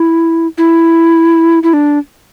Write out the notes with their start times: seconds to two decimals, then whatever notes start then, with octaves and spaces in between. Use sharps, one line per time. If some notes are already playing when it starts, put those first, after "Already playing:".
Already playing: E4
0.58 E4
1.63 E4
1.73 D4